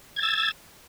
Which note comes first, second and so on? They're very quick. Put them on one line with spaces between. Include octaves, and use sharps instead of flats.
G#6 A6 E6